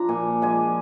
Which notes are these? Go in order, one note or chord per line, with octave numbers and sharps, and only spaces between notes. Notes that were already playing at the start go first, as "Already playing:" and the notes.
Already playing: F3 D4 A#5
A#2 G#5
F3 G#3 D4 G#5